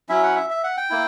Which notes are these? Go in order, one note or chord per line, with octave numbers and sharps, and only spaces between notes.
F#3 C#4 E4 E5
F#5
E5
E5
F#5
G5
A#3 E4